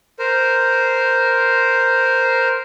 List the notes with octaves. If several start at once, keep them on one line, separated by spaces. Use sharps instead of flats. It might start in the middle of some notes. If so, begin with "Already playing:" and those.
A#4 C5